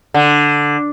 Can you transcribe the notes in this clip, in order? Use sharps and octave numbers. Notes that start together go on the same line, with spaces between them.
D3